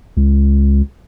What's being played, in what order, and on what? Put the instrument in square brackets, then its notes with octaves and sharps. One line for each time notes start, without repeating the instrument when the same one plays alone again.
[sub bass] C#2